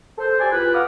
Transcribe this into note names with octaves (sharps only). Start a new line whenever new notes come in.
A4 C5
G4 A4 C5 D5 G#5
E2 F4 B4
F5 F#5 D6 D#6 F6